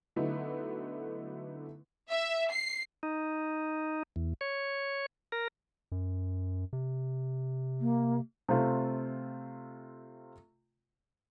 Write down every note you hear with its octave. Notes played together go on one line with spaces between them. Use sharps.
D3 F#3 A3 B3 D#4 E4
E5
C7
D#4
E2
C#5
A#4
F#2
C3
A#3
C3 A3 C4 F4